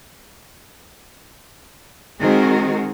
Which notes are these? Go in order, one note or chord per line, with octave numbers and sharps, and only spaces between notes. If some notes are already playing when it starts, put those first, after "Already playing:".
D#3 G#3 C4 F#4 G#4 A#4